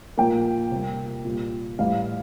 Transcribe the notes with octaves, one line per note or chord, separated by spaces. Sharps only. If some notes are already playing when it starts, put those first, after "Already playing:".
A#2 F3 A#3 G5
C3 G3 A#3
A#2 G3 A#3
A2 E3 G3 F5